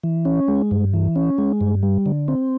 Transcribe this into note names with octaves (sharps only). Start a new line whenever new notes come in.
E3
C#4
G#3
G2
E3
C#4
G#3
G2
G3
D3
C4